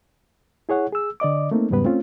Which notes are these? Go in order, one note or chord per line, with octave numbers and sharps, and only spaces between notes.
E4 G#4 C#5 F#5
G#4 E6
D3 D5 D#5 D6
A3 A#3 C4 D#4
E2 G#2 C#3 G3 B3 B4
A3 C4 C#4 F4